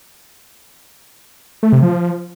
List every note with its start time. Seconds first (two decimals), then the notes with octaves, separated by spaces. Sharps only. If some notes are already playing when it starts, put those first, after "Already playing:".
1.63 A3
1.73 C3
1.82 F3